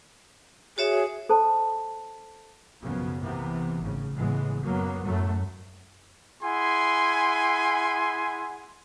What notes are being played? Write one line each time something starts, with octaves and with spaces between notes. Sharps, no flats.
F#4 G#4 C#5 E5
A4 C5 A5
B1 F#2 C#3 F3 B3
C3 E3 A#3 B3
G#1 A2 C#3
A2 C#3 E3 G#3 B3
F#2 F#3 A#3 B3
F#2 A2 F#3 A3
E4 G#4 F#5 G#5 C6